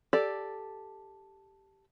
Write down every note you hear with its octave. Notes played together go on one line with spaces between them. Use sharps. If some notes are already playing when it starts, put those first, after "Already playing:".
G4 A4 D5